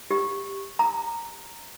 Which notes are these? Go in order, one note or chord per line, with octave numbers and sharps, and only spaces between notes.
G4
A#5